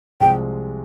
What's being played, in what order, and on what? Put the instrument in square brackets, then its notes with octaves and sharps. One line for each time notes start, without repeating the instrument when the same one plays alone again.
[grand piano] C2 C3 F3 G#3 C4 [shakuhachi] G5